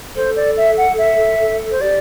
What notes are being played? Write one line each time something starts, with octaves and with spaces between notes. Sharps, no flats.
A4 C5
D5
E5
F#5
E5
C5
G4 D5